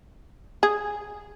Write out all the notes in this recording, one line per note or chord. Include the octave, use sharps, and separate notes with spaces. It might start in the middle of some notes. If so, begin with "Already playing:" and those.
G#4